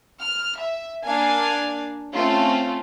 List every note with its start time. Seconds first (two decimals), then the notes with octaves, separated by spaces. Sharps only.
0.22 F6
0.62 E5
1.04 A#3 D4 F5 G#5
2.14 A3 C4 C#4 F4